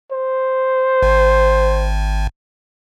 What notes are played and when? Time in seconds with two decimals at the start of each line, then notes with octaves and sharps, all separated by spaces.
0.12 C5
1.03 G#1